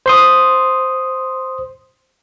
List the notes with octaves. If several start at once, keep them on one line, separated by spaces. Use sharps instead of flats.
C5 C6 D#6